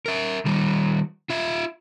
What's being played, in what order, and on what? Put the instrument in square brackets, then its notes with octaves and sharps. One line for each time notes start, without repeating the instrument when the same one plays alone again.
[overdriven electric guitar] A#4 E5
D#3 G3
F4 E5